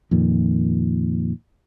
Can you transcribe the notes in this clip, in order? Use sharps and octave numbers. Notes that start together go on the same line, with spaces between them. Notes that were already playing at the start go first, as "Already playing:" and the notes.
F2 A#2 D#3